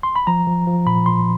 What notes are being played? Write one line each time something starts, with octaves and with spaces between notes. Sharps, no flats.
C6
B5
F3 A#5
F3
F3
A#2 B5
A#2 C6